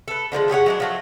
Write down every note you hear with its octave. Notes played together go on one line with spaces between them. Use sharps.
A4 B4
D3 F3 G3 G#3
G4 G#4 C#5 F#5
F#3 G#3 D4
F3 F#3 A3